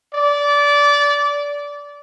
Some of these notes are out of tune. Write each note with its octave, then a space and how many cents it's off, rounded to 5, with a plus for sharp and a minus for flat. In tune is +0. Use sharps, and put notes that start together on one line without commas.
D5 -20